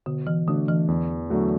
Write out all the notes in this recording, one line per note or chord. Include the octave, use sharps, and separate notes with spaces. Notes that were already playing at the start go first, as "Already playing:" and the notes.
B2 D3
E3
D3 A3 D4 F#4
E3
E2
D3 F#3 A3 F#4